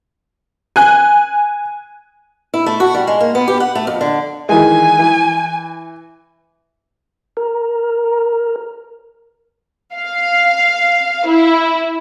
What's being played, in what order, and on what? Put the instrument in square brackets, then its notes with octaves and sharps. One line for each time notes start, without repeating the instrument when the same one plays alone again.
[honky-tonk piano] G#5 F#6
[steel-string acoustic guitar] E4
A3
F#4
G3
G#3
A#3
B3
G4
F#5
A3
F2
D3
[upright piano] D#3 E3 G#3 [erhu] G#5
[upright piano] E3
[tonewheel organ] A#4
[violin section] F5
E4